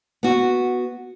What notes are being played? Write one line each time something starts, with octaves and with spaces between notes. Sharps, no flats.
B3 F#4